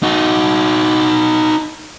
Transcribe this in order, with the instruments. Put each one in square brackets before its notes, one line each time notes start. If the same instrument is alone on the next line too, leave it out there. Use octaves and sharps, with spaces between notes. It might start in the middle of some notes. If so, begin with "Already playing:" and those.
[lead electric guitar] D#4 F#4